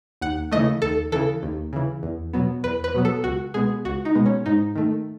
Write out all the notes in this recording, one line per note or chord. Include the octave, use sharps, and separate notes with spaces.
D#2 F#5
C#3 E3 A3 D#5
D#2 A4
C#3 E3 A4
D#2
C#3 E3
E2
B2 F#3 B3
E2 B4
B4
B2 F#3 B3
A4
C#2 F#4
B2 G#3 B3 G#4
C#2 F#4
D#4
B2 G#3 B3
C#4
G#2 D#4
D#3 A3